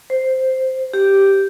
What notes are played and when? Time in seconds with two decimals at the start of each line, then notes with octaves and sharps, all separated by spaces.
0.10 C5
0.93 G4